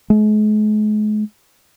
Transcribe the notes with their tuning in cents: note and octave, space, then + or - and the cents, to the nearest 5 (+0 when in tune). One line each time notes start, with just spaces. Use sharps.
G#3 +40